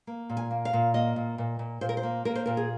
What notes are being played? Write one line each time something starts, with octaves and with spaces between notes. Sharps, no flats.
A#3
A#2
G#5
A#3
F5
A#2
A#3 D#5
A#2
A#2
A#2
A#2 C5
A#4
C5
A#3
A#3 A#4
C5
A#2 A#4
G#4